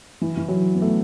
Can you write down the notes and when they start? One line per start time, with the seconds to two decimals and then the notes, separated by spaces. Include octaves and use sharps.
0.22 E3
0.37 E3
0.48 F#3
0.75 B3
0.82 A3